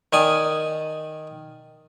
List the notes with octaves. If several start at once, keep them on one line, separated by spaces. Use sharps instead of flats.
D#3 D5 G#5 D#6